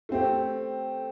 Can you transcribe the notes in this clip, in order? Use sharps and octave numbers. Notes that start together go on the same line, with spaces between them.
A3 C4 G4